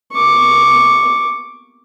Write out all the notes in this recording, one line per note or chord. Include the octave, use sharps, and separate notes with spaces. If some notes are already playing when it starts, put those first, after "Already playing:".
C#6 D6